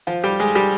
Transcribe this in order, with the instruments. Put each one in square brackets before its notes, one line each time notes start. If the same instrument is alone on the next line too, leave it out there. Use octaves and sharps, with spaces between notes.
[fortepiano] F3 F4
G3 G4
G#3 G#4
G3 G4